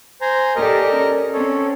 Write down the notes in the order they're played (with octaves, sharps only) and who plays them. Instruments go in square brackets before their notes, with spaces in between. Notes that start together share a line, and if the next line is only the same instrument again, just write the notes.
[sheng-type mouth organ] C5 G#5 A#5
[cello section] G4 A4 D5 [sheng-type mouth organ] A#4 D#5
[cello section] C#4
[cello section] C4 C#4 [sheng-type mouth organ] A4 C#5